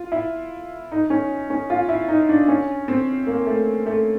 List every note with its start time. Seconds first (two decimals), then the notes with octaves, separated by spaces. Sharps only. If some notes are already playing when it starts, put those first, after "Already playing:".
Already playing: F4
0.12 E4
0.92 D#4
1.10 C#4
1.50 C#4
1.70 F4
1.89 E4
2.08 D#4
2.29 D4
2.48 C#4
2.88 C4
3.27 A#3
3.47 A3
3.86 A3